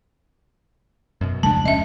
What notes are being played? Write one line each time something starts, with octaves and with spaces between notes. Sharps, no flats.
F#2 B2
D1 F2 C#3 G#3 A3 D4 A5
C#4 D#5 E5